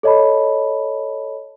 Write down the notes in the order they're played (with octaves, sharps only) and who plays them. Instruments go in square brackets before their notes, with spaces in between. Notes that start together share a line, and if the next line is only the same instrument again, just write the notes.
[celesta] A4 C#5 D#5 A5 B5